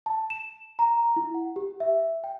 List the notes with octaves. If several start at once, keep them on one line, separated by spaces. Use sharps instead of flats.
A5
E7
A#5
E4
F#5
G4
E5
G5